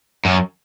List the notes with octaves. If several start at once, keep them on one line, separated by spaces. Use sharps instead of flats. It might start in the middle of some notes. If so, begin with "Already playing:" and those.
F#2